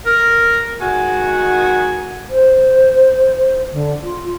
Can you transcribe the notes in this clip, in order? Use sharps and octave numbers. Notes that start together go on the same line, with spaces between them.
A#4
D#3 G#3 F#4 G#5
C5
D3
F4